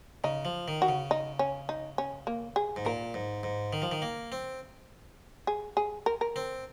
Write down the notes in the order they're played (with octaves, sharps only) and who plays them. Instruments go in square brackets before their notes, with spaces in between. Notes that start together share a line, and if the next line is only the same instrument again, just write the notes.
[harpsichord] C#3 [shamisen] D#4
[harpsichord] F3
D#3
[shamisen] F#4
[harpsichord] C#3
[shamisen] D#4
C#4
D#4
C#4
A#3
G#4
[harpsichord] G#2
[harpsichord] A#2 [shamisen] A#4
[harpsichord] G#2
G#2
D#3
F3
D#3
A#3
C4
[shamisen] G#4
G#4
A#4
A#4
[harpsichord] C4